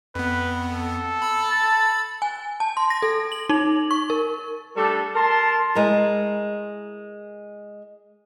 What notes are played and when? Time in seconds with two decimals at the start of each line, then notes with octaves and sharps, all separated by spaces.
0.15 F2 B3 B4
0.73 A4
1.22 B5 E6
1.51 A5
2.22 G#5
2.60 A5
2.77 C6
2.90 A#6
3.02 A4
3.32 F#7
3.49 D#4
3.91 C#6
4.10 A#4
4.76 G3 A3 D4 A4
5.15 A#4 A5 C6
5.75 G#3 E4 A#4